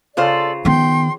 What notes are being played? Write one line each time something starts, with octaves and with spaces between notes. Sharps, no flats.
C#3 F4 A4 C5 D5
D#3 B3 G5 C6